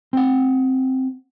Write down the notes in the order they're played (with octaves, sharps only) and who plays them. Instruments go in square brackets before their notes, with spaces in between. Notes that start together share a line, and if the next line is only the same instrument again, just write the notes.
[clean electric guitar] C4 F#5